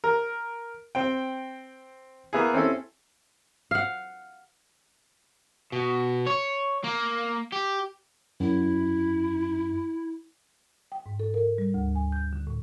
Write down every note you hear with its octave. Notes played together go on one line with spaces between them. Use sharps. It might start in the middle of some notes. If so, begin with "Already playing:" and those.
A#4
C4 G5
A#3 B3 E4 G#4
C4 C#4 E4 A4
F5 F#5
B2
C#5
A#3
G4
F#2 E4
G5
G#2
A4
A#4
G3
D2
G#5
G6
D3
A2